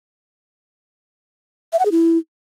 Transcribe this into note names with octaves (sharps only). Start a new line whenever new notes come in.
E5
F#5
G#4
E4